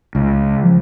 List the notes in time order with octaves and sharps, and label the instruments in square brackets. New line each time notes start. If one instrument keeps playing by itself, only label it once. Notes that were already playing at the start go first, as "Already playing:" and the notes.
[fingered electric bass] C#2
[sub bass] F3